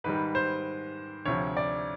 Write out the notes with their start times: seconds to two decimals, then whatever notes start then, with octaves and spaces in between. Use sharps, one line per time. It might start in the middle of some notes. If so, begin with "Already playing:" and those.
0.04 G#2 D#3 G3 B4
0.35 C5
1.25 D2 C3 F3 C#5
1.57 D5